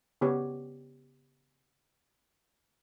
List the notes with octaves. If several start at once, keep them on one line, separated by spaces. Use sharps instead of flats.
C#3 B3 G4 C#5